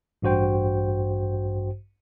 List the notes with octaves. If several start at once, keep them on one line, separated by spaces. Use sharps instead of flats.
A1 G2 F#4 C5 G5